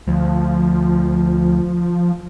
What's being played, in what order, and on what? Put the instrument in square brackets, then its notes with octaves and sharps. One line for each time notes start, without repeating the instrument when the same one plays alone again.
[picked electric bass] D2 [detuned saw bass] F3